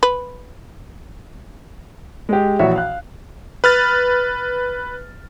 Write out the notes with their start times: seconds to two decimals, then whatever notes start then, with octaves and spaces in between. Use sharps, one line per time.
0.03 B4
2.29 G#3 G4
2.59 A#1 E3 F#4 C#5 E5
2.76 F5 F#6
3.64 B4 F6 A6